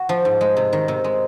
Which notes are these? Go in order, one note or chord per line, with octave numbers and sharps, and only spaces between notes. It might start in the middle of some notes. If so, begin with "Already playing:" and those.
Already playing: F#4
F3
G#2
G#3
C3
D#3
C3
G#3